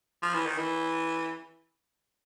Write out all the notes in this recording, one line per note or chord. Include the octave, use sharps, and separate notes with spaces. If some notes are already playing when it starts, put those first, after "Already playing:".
F3
E3
D#3
E3